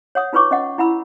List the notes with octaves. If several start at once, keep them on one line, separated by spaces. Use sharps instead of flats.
C#5 F#5 D#6
D#4 F4 B4 C#5 C#6 D6
C#4 D#5 F#5
E4 F#5 B5 E6